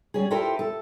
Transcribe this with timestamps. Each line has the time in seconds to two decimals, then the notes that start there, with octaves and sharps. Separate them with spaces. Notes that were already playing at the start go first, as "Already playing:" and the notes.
0.14 G3 C#4 G#4
0.31 E4 F4 G4 A4 A#4 C5
0.59 A4